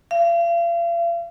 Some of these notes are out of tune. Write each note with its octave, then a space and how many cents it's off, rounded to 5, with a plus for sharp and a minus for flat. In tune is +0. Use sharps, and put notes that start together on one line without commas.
F5 -40